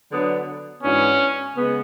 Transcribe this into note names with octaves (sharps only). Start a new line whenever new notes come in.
D3 F#3 B3 D4
G#2 E3 B3 C#4 D4 F#4
C#3 G#3 B3